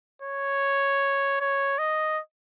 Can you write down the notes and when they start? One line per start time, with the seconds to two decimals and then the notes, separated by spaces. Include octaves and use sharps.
0.22 C#5
1.41 C#5
1.79 D#5